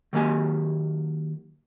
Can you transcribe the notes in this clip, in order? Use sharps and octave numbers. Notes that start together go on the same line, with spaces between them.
D#3 F#3 A#3 G4 G#5